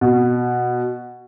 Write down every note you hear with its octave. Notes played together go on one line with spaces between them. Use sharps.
B2